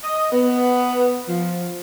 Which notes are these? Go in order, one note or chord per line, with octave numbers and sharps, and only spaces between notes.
D#5
B3
F3